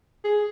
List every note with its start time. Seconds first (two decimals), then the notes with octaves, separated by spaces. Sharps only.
0.25 G#4